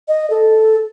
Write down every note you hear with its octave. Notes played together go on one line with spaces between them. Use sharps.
D#5
A4